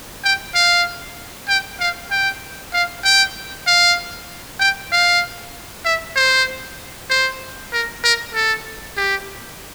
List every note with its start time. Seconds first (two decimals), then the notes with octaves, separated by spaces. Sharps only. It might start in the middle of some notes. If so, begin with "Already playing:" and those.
0.24 G5
0.55 F5
1.48 G5
1.80 F5
2.11 G5
2.73 F5
3.04 G5
3.67 F5
4.60 G5
4.92 F5
5.85 E5
6.16 C5
7.10 C5
7.73 A#4
8.04 A#4
8.34 A4
8.97 G4